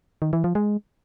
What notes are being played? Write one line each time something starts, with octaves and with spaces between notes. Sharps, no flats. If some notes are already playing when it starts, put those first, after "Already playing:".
D#3
E3
F3
G#3